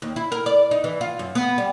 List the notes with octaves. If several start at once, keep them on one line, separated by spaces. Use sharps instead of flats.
D#2
E4
A#4
D5
D#4
E3
F4
F#2
B3
G3